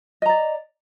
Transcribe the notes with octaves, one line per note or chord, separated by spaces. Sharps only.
D5 D#5 A#5